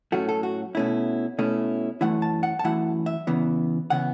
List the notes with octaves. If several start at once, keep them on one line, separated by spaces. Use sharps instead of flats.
A2 F#3 A3 C#4 F#4
A4
F#4
B2 A3 C#4 E4
B2 A3 C#4 E4
F#2 E3 A3 E4 F#5
A5
F#5
A5
F#2 E3 A3 E4 F#5
E5
E2 C#3 E3 B3
C#3 E3 B3 F#5